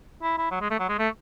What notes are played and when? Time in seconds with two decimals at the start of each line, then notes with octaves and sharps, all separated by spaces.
0.23 E4
0.38 E4
0.51 F#3
0.61 G#3
0.70 A3
0.79 F#3
0.89 G#3
0.99 A3